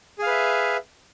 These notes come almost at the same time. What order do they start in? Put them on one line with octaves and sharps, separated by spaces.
G#4 F5 B4 E5